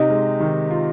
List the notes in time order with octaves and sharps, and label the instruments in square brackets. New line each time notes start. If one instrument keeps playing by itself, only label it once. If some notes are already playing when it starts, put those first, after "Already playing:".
Already playing: [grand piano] C3 [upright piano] D#4
[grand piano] G#3
D#3
F4